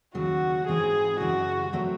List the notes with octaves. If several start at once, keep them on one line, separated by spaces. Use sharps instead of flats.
D#2 C#3 F#3 F#4
G#2 E3 C4 G#4
F#2 C#3 E3 G#3 F#4
F#3 A3 C4 F#4 C#5